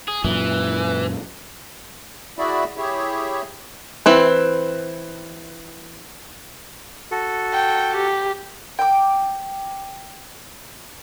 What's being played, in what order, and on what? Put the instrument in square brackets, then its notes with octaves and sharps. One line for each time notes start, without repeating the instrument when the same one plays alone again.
[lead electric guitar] G#4
[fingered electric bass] F#2 A#2 [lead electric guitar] E3
[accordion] E4 F#4 G#4 D5 E5 B5
E4 G4 G#4 C#5 E5
[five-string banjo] E3 C4 B4
[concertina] F#4 A4
[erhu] G5
G4
[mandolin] G5 D6